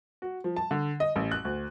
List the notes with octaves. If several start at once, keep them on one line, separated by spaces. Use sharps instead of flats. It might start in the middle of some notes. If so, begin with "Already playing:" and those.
F#4
F3
A5
D3
D#5
A1
F#6
D2